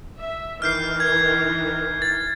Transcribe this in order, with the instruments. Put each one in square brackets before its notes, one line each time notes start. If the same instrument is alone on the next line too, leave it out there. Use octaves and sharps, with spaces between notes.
[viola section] E5
[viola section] D#3 E3 [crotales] F6 G6 C7
[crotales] G#6
A6